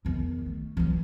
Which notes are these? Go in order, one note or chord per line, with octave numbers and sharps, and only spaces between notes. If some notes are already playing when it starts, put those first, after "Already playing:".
E2 D#3
A3
E3 F#3